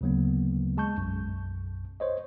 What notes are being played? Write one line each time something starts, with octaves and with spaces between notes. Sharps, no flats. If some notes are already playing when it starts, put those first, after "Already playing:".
D2 C#3 F#3 A#3 B3
G#3 A5 C#6 G6
B1 F#2
C5 C#5 D#5